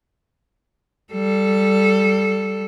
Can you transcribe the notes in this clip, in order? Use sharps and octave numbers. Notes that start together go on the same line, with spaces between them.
G3 A4